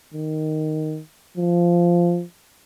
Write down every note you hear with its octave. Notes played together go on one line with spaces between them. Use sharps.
D#3
F3